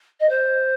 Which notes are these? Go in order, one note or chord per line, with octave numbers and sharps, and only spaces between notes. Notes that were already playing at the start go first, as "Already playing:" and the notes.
D#5
C5